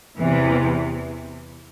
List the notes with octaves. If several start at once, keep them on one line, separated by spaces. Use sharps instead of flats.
E2 C3 E3